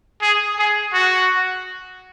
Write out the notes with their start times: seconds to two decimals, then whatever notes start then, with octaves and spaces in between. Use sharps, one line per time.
0.22 G#4
0.59 G#4
0.93 F#4